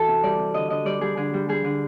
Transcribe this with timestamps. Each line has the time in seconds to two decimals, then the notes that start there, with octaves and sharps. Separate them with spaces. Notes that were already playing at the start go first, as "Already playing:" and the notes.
Already playing: E3 F#4 A4
0.08 C3
0.23 G3 D5
0.39 C3
0.54 D3 D#5
0.70 D3 D#5
0.85 G3 D5
1.01 G3 G#4
1.17 D3 G#4
1.34 G3
1.49 G3 G#4
1.64 D3